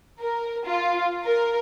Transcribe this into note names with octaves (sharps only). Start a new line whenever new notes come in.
A#4
F4
A#4